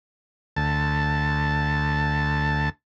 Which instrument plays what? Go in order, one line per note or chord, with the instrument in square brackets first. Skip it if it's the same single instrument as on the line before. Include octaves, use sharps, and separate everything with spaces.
[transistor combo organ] D2 A5